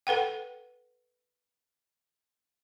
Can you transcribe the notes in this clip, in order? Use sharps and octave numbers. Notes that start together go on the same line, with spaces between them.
A4 B4 F#5 G5